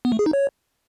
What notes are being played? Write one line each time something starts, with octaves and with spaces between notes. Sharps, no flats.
B3
A3
G#4
D#4
C#5